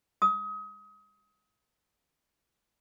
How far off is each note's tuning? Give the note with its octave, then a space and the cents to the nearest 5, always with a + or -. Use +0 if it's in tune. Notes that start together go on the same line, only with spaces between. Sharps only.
D#6 +30